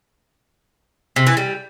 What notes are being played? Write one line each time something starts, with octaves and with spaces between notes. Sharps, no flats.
C3
E3
G3